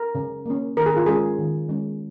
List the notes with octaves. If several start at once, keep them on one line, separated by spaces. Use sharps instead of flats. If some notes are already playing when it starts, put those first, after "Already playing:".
Already playing: A#4
C#3
A#3 C#4
D#3 A#4
G#4
F4
G#3 C#4 G#4
D#3
G#3 C#4